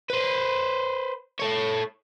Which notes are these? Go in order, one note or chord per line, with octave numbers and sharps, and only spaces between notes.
B4 C5
A4 C#5